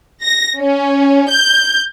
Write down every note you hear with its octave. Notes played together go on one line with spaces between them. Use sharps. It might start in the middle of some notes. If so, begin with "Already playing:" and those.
A#6
C#4
G6